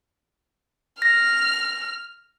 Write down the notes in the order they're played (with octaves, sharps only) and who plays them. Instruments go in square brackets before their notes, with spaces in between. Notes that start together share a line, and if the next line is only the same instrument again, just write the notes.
[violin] F6 [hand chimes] A#6